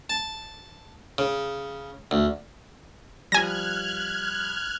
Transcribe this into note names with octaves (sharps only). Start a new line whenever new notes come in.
A5
C#3
D2
F3 G3 G#5 F6 F#6 G#6 A#6